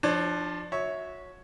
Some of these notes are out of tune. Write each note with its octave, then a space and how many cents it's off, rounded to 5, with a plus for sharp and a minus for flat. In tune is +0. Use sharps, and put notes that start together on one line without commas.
F3 +0 D4 +25 C#5 -10
F#4 -30 C#5 +0 E5 -20